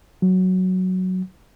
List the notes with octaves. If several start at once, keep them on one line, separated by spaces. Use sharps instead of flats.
F#3